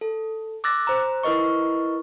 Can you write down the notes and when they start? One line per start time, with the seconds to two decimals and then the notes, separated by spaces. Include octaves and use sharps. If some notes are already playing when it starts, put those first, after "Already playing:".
0.01 A4
0.64 D6 E6 F#6 A6 A#6
0.87 C5 A#5
1.23 E4 A#4 B4 D#5 C#6